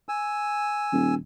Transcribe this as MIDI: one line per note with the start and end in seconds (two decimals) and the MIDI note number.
0.09 1.15 80
0.09 1.15 88
0.93 1.16 27